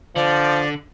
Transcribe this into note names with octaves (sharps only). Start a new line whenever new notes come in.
D3 F3 D5